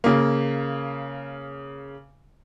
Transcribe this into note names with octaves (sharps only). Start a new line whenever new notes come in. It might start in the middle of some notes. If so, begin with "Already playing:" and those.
C#3 A#3